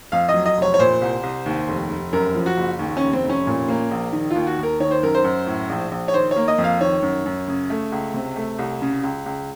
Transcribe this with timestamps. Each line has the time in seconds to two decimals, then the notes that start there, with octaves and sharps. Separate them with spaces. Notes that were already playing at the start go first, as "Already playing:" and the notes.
0.12 F2 F5
0.29 D#5
0.34 F#3
0.46 D#5
0.57 F1 C#5
0.74 C#5
0.79 A#2 C5
1.01 C2
1.23 C2
1.46 D#2
1.68 F1
1.90 F1
2.13 F#2 A#4
2.35 F3
2.46 F#4
2.57 F#1
2.79 D#2
2.97 F1 C#4
3.13 C4
3.24 F1
3.29 C#4
3.47 A#2
3.68 A#3
3.91 A#1
4.13 D#3
4.30 D#2 F4
4.47 F#4
4.58 D#2
4.63 A#4
4.80 D#3 C#5
4.91 C5
5.03 F#2 A#4
5.14 C5
5.24 F#2
5.46 A2
5.69 A#1
5.91 A#1
6.08 C#5
6.14 D#3 C5
6.31 C#5
6.36 A#3
6.48 D#5
6.58 F2
6.64 F5
6.81 D#3 C#5
7.02 F#2
7.25 F#2
7.48 C#3
7.70 A3
7.92 C#2
8.14 C3
8.36 A3
8.58 C2
8.82 C#3
9.03 C#2
9.26 C#2